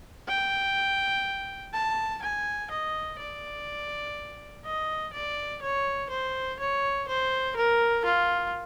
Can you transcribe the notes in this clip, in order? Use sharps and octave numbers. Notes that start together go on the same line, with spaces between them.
G5
A5
G#5
D#5
D5
D#5
D5
C#5
C5
C#5
C5
A#4
F4